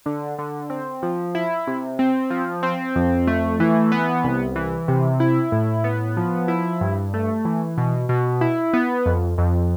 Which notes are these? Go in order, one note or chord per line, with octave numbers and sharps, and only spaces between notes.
D3
D3
C4
F3
E4
C3
C4
F3
C4
F2
A3
E3
B3
C2
E3
C3
E4
A2
B3
F3
E4
G2
A3
E3
B2
B2
E4
B3
F2
F2